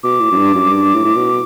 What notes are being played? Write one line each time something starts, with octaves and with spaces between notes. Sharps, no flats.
B2 D6
A2
F#2
G2
F#2
G2
A2
A2
B2